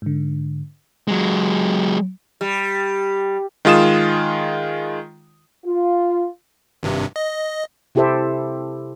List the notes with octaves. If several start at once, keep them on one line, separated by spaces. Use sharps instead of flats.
G#2 D3
F#3 G#3
G3
D#3 G#3 F4 D#6 E7
F4
G#1 G2 C3
D#5
C3 E4 G4 A4 C5 E5